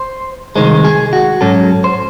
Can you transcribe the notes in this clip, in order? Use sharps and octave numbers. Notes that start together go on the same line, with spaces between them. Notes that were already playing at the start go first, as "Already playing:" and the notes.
Already playing: C5
C2 C3 D#3 G#3 C5
G#4
F#4
G#2 F#3 C#4 A4
C5